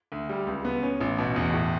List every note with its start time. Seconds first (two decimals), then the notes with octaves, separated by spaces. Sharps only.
0.12 D2
0.29 G3
0.47 C#2
0.65 B3
0.83 C#4
1.01 A1
1.18 B2
1.36 E2
1.54 A2